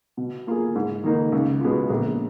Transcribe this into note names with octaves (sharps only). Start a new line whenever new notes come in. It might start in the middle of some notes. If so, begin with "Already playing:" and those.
B2
A#3 F4 G#4
G#2
D#3 A#3 D#4
C#2
B2 G#3 B3 F4
A#1